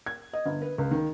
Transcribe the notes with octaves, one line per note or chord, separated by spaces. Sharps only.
G#6
D#5
G1
B4
C#2
D#3